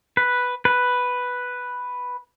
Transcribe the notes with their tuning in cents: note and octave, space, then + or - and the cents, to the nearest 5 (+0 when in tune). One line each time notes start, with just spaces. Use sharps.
B4 +0
B4 +0